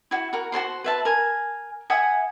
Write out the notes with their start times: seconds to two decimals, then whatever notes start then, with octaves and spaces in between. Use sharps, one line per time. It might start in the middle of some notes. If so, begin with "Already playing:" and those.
0.11 E4 F#4
0.33 F#4 A#4
0.52 F#4 A4 C5 C6
0.84 B4 E5 A5
1.05 A#4 G#5
1.90 E5 F#5 G#5 D#6